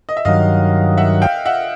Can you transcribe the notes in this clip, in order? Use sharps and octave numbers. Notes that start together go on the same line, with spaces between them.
D#5
E5
G2 D#3 F#3 D#5 F5
E5 F#5
F5 G5
E5 F#5